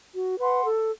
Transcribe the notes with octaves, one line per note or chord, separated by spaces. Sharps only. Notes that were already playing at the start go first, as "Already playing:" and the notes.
F#4
B4 F#5 C6
A4